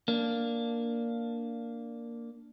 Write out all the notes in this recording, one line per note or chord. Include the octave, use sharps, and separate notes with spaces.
A#3 D4